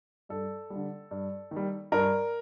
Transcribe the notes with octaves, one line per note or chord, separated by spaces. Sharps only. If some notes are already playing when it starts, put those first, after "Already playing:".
G2 A4
D3 G3
G2
D#3
G3
G2 A#4